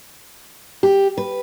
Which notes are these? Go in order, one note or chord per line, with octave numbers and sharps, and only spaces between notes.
G4
B4